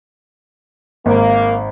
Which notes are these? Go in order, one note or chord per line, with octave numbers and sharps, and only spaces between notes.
G#1 A#3